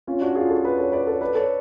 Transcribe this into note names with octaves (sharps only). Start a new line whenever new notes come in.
C#4 F4
D4 F#4
F4 G#4
F#4 A4
G#4 B4
A4 C#5
B4 D5
A4 C#5
B4 D5
A4 C#5